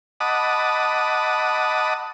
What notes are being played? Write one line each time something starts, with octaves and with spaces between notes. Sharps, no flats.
D#5 F#5 A5 B5 D6 D#6